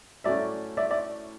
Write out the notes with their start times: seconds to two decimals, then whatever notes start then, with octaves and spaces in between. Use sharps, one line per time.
0.24 A2 F#3 A3 C#4 D5 E5
0.77 D5 E5
0.90 D5 E5